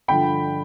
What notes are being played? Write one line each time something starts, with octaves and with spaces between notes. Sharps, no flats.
G2 D3 F3 G5 B5